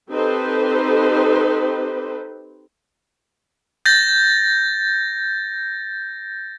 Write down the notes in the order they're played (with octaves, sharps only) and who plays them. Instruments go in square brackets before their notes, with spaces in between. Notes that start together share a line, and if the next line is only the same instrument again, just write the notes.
[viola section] C4 D#4 G4 A4 B4 C5
[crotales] G6 A6 A#6